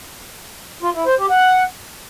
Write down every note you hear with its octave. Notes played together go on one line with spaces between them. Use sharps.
F4
E4
C5
G4
F#5